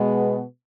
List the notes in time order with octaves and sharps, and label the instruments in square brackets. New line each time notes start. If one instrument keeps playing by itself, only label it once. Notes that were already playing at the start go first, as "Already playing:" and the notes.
Already playing: [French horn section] B2 G#3 B3